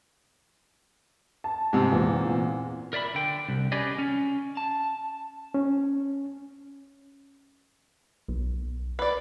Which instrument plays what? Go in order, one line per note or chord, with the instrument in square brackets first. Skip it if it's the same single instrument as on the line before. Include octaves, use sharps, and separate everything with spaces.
[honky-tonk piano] A5
[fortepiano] G#2 C3
[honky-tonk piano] E2 A#2
[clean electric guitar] A#4 D5 E5 B5
D3 G5
C2
C#4 G4 G#4 B4 D5 D#5
C#4
[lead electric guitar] A5
[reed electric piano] C#4
[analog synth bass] B1
[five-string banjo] B4 D5